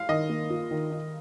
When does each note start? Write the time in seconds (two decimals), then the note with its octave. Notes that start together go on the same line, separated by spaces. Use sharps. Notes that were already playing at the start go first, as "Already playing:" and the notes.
Already playing: F5
0.09 D#3 D#5
0.29 A#3
0.50 F4
0.71 D#3
0.91 D#4